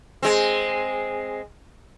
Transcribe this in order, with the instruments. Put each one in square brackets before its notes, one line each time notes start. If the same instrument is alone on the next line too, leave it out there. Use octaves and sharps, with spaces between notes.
[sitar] G#3 C4